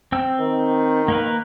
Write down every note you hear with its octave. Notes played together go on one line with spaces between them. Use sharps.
C4 G5 E6
D#3
A#3 A#4 B4